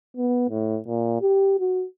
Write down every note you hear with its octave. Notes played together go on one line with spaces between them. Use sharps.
B3
A2
A#2
G4
F#4